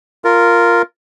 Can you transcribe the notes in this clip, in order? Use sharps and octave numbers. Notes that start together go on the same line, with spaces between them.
F4 A#4